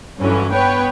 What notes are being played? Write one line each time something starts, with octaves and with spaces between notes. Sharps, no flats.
G2 D3 E3 F#3 C#4
B3 B4 C#5 G5